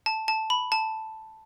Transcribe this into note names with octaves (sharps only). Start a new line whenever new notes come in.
A5
A5
B5
A5